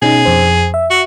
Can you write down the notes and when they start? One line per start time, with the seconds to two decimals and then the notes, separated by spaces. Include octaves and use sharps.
0.02 B2 C#4 D#4 G#4
0.25 F2 C5
0.74 E5
0.90 F#4